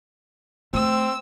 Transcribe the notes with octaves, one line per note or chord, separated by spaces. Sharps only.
A3 C4 E6